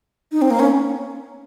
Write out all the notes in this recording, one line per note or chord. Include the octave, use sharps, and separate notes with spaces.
D#4
C4
A#3
C#4